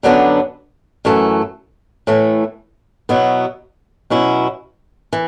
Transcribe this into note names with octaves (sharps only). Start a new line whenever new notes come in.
F#2 D3 F#3 B3 D4
F#2 E3 A3
A2 E3 A3
B2 F#3 B3 E4
B2 F#3 C#4 E4
E3